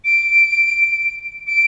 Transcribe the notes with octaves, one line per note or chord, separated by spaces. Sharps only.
D7
D7